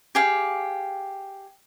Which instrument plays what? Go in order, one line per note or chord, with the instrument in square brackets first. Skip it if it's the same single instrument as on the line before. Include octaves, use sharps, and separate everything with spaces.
[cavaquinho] G4 G#4 F5